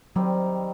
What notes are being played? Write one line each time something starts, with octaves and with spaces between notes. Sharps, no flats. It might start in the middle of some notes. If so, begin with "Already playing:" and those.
D#3 F#3 G3 C4